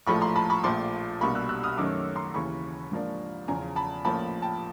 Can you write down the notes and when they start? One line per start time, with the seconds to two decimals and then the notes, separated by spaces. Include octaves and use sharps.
0.07 A#1 A2 F3 A3 B5 C#6
0.21 A#5 C6
0.36 A5 B5
0.50 B5 C#6
0.63 A#1 A#2 F3 A3 C6 D6
1.20 C2 B2 G3 A#3 D4 B5 C#6
1.35 E6 F#6
1.49 E6 F#6
1.64 D#6 F6
1.77 F#2 D#3 F#3 A3 C#4 D6 E6
2.16 A#5 C6
2.34 D#2 C#3 E3 B5 C#6
2.92 G#2 F3 A#3 D4
3.48 E2 C#3 F3 G#5 A#5
3.76 A5 B5
4.05 A#1 A2 F3 A#3 C#4 A5 B5
4.42 G5 A5